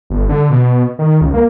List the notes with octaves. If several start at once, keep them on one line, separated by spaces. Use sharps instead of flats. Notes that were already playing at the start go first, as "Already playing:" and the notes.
G1
D3
B2
D#3
C#2
A#3